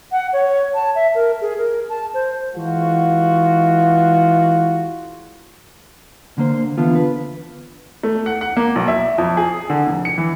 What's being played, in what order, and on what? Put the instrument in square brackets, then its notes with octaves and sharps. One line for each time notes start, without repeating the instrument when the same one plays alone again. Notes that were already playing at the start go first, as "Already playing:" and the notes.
[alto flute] F#5
C#5
A5
E5
A#4
G#4
A#4
A5
C5
[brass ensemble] E3 G#3 F4 F#4
[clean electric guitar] D3 A#3 C5
D3 E3 B3 F4
B4
[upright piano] A3
F#5
F#5
A#3
B1
E5
F2
G#4
D3
F1
C#7
E3